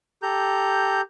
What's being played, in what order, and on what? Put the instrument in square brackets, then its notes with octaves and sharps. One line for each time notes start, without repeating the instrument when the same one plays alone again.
[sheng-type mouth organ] G4 A4 A#5 G6